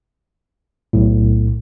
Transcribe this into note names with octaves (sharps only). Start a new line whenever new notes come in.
B1 A2